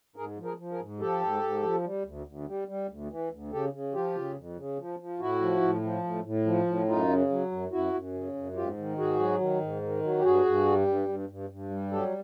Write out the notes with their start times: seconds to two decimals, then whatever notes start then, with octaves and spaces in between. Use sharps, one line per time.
0.16 G#2 G#4 A#4
0.38 F3
0.44 G#4 A#4
0.58 F3
0.72 G#4 A#4
0.79 G#2
1.00 F3 G4 A4
1.21 G#2
1.43 G#2
1.63 F3
1.84 G3
2.05 D2
2.27 D2
2.47 G3
2.68 G3
2.89 D2
3.10 E3
3.32 D2
3.52 C#3 G4 A4
3.73 C#3
3.94 F3 F4 G4
4.15 C#3
4.36 F2
4.57 C#3
4.78 F3
4.99 F3
5.20 A2 E4 F#4
5.41 F3
5.62 A2
5.83 F3
6.04 A2
6.24 A2
6.46 F3
6.66 A2
6.88 F#2 D#4 F4
7.09 C#3
7.30 F#3
7.51 F#2
7.71 F#2 E4 F#4
7.94 F#2
8.14 C#3
8.34 F#2
8.55 G#2 F4 G4
8.77 D#3
8.98 G#2 F#4 G#4
9.19 F#3
9.40 D#3
9.61 G#2
9.82 D#3
10.03 F#3
10.18 G4
10.23 G2 F#4 G#4
10.45 G2
10.65 G3
10.87 G2
11.08 G2
11.29 G2
11.50 G2
11.70 G3
11.91 F#3 G4 A4